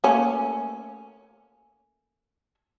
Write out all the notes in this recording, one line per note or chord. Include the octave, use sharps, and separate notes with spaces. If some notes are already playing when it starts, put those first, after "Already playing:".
A3 A#3 C#4